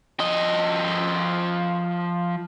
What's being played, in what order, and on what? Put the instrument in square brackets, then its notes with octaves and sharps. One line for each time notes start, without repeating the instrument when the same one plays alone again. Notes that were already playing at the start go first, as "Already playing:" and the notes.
[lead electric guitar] F3 D#5